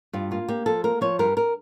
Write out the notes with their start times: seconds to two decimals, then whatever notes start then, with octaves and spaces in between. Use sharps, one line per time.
0.13 G2 F4
0.31 A#3 F4
0.48 A#3 G4
0.66 F3 A4
0.84 A#3 A#4
1.01 F3 C#5
1.19 G2 A#4
1.37 A#4